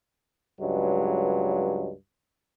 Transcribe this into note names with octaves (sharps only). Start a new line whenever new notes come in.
C#2 G2 F#3 G#3